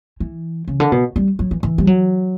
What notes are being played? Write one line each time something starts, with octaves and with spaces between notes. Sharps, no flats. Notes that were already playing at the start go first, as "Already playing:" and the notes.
E3
C#3
D3
B2
G3
F#3
E3
E3
G3
F#3